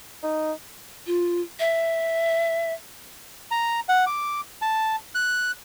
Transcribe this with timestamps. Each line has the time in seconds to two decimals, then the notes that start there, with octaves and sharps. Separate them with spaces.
0.23 D#4
1.07 F4
1.60 E5
3.51 A#5
3.89 F#5
4.07 D6
4.62 A5
5.15 F#6